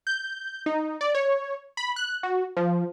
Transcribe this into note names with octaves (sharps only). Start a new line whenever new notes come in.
G6
D#4
D5
C#5
B5
F#6
F#4
F3